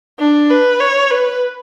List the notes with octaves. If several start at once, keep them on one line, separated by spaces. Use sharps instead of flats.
D4
B4
C#5
B4